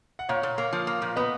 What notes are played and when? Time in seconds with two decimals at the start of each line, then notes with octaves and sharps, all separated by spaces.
0.19 F#5
0.29 A#2 C#5 F5
0.43 A#2
0.58 A#3
0.73 F3
0.87 A#3
1.02 A#2
1.16 B3 B4 D#5